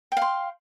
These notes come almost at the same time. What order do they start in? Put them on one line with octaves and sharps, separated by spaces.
G5 F5 C6